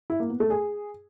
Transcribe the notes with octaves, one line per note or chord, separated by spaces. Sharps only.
E4
A#3
B3
A3
G#4